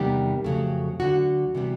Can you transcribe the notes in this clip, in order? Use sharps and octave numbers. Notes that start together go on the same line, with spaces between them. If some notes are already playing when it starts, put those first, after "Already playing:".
Already playing: E2 C3 D#3 G3 B3 G4
F2 C#3 F#3 A3
D2 D3 F#3 F#4
C3 E3 G3 B3